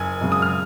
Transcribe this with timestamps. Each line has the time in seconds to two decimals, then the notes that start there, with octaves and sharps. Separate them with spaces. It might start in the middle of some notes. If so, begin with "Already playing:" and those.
Already playing: F#1 G#5
0.21 F#2 C#3 G#3
0.32 D#6
0.42 F6